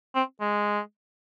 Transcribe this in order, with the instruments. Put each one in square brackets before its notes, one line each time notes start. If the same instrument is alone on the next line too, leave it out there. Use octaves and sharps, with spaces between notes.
[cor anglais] C4
G#3